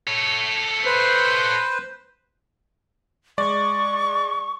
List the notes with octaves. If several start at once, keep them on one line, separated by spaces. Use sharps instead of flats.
A4 C#5
B4 C5
G#3 D5 C#6